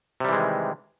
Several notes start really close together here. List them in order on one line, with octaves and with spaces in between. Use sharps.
C3 G3 E3 G#3 D#3